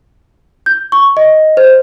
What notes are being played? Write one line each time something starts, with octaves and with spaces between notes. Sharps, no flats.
G6
C#6
D#5
C5